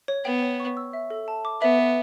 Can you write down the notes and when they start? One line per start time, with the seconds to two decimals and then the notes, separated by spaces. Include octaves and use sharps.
0.08 C#5
0.25 B3 G5
0.42 C#5
0.60 C#6
0.77 E6
0.93 E5
1.10 A4
1.28 A5
1.45 D6
1.61 B3 E5
1.79 B4